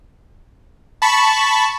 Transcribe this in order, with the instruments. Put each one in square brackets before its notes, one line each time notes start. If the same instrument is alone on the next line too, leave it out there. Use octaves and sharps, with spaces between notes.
[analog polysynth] A5 B5 C#6